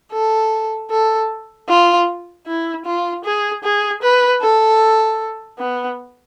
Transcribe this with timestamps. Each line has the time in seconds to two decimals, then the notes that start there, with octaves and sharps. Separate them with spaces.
0.12 A4
0.90 A4
1.69 F4
2.47 E4
2.86 F4
3.25 G#4
3.64 G#4
4.03 B4
4.42 A4
5.59 B3